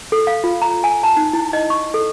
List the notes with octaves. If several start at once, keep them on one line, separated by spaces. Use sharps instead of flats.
A4
F5
F4
A#5
G#5
A5
D#4
E4
D#5
C#6
A4